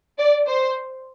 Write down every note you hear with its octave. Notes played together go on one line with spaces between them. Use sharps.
D5
C5